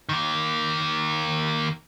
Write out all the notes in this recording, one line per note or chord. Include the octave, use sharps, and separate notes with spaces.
D#3 A#3